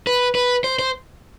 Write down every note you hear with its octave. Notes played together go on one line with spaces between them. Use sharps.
B4
B4
C5
C5